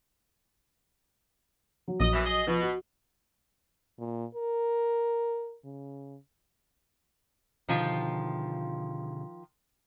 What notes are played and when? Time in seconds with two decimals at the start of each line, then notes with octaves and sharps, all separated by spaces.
1.88 F#3
2.00 A#1 D#5
2.13 F#2 B2 E3
2.25 G#4 D#5
2.47 B2 F3
2.62 F#4
3.98 A#2
4.35 A#4
5.64 C#3
7.69 B2 D3 D#3 F3 F4